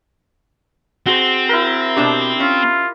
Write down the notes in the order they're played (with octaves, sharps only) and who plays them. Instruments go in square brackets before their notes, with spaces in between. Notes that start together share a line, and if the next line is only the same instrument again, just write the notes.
[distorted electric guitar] C4 [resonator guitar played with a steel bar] F#4 G#4 C5
[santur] E4 A#4
[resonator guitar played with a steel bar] B2 D4 G4 [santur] D6
[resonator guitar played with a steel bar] C#4 [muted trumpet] F4